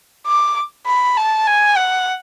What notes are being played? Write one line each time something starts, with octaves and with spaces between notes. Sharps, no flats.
D6
B5
A5
G#5
F#5